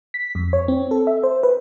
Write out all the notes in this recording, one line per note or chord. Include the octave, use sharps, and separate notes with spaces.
B6
F2
C#5
C4
A4
E5
C5
B4